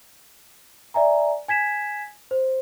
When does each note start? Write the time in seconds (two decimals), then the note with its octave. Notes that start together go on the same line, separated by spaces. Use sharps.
0.94 D5 E5 G#5 A#5
1.48 G#5 G#6 B6 E7
2.31 C5